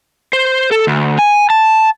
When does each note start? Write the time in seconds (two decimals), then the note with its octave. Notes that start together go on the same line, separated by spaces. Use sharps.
0.33 C5
0.71 A4
0.87 D2
1.19 G#5
1.50 A5